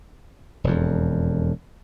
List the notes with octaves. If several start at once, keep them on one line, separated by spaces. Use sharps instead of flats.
E1 F2